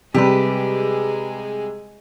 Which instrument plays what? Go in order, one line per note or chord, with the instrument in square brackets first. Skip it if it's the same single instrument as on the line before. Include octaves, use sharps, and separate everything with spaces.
[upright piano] C3 G3 [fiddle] G#3 G#4 [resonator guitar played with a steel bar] G4 B4